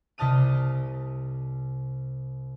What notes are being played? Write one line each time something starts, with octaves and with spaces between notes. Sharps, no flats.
C2 C3 D#5 A5 F6 D#7